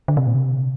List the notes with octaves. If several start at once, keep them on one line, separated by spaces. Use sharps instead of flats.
D3
C3
A#2
C3